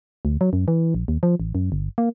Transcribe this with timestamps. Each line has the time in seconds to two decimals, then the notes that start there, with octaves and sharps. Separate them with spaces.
0.25 D2
0.41 F#3
0.53 F#2
0.68 E3
0.95 A#1
1.08 D#2
1.23 F3
1.40 A1
1.55 F#2
1.72 G1
1.98 A#3